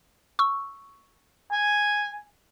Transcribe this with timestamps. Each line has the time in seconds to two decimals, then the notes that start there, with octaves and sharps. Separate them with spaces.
0.39 C#6 E6
1.52 G#5